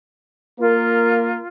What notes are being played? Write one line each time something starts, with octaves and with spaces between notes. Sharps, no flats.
A#3 F4 A#4